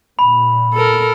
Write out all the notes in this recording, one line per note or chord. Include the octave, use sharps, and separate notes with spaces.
A#2 B5
A4 A#4